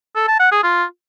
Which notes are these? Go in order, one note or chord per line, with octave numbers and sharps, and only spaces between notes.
A4
A5
F#5
G#4
F4